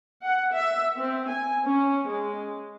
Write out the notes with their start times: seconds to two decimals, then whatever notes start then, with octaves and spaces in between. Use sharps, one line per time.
0.23 F#5
0.54 E5
0.99 C4
1.31 G#5
1.66 C#4
2.08 G#3